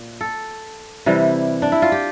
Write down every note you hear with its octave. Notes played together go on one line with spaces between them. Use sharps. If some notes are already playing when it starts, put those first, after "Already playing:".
Already playing: A#2
A4
C3 E3 G3
D4
E4
F4
G4